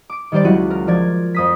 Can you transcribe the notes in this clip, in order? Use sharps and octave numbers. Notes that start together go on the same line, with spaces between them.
D6 D7
D#3 G3 G4 C5 D5
C#2 F#3 E4 F#4 F#6 D#7
A#4
F3 D5 G#6
F2 D#6 B6